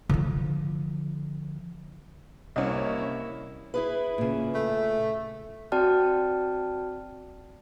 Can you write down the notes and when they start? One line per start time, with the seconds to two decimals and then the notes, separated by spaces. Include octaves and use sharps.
0.09 D3 F3
2.56 C2 A#3 C#4 E4 D#5
3.74 E4 G#4 B4
4.18 A#2 C#3
4.55 A3
5.72 C4 F#4 D5 G5 A5 F6